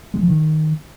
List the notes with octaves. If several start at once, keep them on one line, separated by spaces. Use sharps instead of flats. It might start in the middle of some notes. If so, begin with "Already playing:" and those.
G#3
F3
D#3